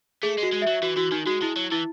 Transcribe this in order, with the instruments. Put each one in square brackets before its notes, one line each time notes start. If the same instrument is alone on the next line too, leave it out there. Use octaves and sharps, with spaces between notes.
[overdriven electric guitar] A3 [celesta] G#4
[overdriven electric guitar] G#3 [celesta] F#4
[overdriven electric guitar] G#3
[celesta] E5
[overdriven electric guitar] F#3
[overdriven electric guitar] E3 [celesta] F#4
[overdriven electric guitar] E3 [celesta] F#4
[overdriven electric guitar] D#3 [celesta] D#4
[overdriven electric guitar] G#3 [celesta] F#4
[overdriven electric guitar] G#3 [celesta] E4
[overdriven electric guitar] F#3
[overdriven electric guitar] E3 [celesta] E4